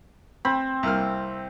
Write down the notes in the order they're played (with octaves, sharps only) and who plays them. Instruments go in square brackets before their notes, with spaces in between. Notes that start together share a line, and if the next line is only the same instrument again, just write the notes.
[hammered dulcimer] C4 [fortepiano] B5
[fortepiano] C2 A#3 F6